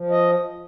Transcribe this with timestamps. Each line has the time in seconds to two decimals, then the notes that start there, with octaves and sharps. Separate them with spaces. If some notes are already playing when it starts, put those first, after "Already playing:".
Already playing: F3
0.10 D#5